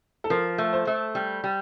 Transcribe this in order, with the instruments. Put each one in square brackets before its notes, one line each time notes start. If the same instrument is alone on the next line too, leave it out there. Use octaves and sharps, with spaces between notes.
[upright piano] A4
[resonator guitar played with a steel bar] F3 [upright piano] A#4
[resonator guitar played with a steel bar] A3
[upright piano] C5
[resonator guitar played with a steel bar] A3
G3
G3